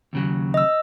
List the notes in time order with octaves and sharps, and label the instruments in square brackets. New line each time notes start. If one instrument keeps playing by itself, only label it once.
[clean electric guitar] D#2 C#3 F#3
[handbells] D#5 E6